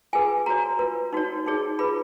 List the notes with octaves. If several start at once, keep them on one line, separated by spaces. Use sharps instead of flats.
F4 G#4 B4 G#5
F#4 C#5 A#5
F4 B4
D#4 F#4 C#5
D#4 G#4 C#5
F4 G#4 B4 B5